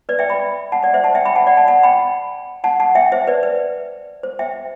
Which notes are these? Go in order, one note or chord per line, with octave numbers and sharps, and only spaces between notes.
B4 D5
E5 G5
G5 B5
F#5 A5
D5 F#5
C5 E5
F#5 A5
E5 G5
G5 B5
F#5 A5
D5 F#5
F#5 A5
F#5 A5
G5 B5
F#5 A5
F#5 A5
E5 G5
C5 E5
B4 D5
B4
C5
E5 G5